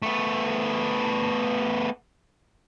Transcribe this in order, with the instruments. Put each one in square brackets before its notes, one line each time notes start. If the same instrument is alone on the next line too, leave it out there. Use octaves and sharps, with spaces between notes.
[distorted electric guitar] A3 B3